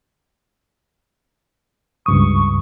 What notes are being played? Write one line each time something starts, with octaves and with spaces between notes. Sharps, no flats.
C#2 G2 C#6 D#6